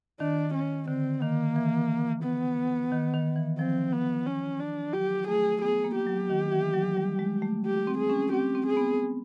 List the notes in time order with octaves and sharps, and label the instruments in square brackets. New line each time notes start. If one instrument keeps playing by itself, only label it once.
[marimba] D#3 [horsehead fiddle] D4
[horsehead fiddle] C#4
[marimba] D3 [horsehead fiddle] C4
[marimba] D#3 [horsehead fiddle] A#3
[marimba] E3
[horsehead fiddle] B3
[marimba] D#3
D#3
E3
[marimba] F3 [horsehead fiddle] C4
[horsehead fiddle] B3
C#4
D4
[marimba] F#3 [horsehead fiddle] G4
[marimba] A3 [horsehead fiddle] G#4
[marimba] B3 [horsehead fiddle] G#4
[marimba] A#3
[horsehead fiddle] G4
[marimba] F#3
D#3
E3
F#3
G3
G#3
A3
[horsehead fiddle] G4
[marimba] C4
[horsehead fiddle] G#4
[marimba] C#4
[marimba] C4 [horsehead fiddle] G4
[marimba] C4
[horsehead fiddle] G#4
[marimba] B3